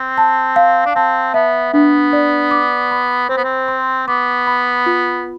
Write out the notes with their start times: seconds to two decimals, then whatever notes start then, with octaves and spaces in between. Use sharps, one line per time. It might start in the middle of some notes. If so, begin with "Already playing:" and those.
Already playing: C4
0.18 A5
0.56 F5
0.86 D4
0.96 C4 A5
1.34 B3 E5
1.74 B3 D4
2.13 D5
2.51 D6
2.91 B5
3.29 C4 C5
3.37 B3
3.44 C4
3.68 C6
4.08 B3 D6
4.47 B5
4.86 F4